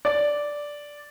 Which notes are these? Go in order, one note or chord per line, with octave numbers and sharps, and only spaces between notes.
D5